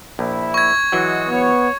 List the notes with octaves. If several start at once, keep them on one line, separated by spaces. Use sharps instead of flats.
A#1 E4
C#6 G#6
E3 F#3 G#3 F#4 D#5
B3 C#5